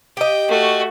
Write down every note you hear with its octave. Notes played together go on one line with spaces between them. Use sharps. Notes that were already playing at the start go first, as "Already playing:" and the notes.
G4 D#5 G5
A3 F#4